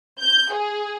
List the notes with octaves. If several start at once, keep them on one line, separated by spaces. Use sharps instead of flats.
G6
G#4